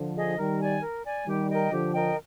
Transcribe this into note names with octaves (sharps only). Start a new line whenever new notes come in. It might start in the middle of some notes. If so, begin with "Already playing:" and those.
Already playing: D3 F3
G#4 D#5
D#3 G3 A#4
D5 G#5
A#4
D5 G#5
D#3 G3 G4
A#4 D#5 G5
D3 F3 G4
A#4 D#5 G5